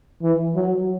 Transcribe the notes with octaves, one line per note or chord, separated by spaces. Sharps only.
E3
F#3